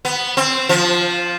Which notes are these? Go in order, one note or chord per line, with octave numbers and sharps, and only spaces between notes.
B3
C4
F3